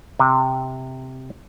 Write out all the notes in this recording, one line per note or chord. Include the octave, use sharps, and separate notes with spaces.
C3